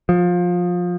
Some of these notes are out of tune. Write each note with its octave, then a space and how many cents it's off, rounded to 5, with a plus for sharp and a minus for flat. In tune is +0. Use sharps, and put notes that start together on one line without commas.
F3 +20